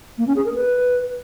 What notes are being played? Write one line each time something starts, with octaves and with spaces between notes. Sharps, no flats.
A#3
C#4
G#4
A#4
B4